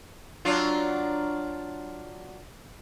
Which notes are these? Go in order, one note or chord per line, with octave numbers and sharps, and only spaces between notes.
F#3 D4 F4